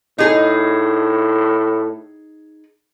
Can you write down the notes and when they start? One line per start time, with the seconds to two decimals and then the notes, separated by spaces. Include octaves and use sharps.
0.18 A2 D#4 G#4